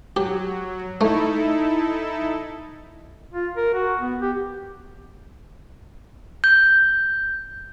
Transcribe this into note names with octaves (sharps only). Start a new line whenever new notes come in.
F#3 G4
A3 D#4 E4 A4
F4
A#4
F#4
B3
G4
G6